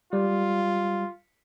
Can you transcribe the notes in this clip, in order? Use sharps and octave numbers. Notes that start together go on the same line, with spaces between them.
G3 F4